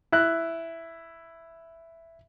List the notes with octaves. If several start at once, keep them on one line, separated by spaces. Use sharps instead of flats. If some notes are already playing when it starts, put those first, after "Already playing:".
E4 F#6